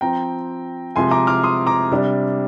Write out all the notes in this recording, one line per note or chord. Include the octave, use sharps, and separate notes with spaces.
F3 C4 G5 A#5
C3 F3 G#3 G#5 C6
A#5 D6
D6 F6
C6 D#6
A#5 D6
C3 G3 D4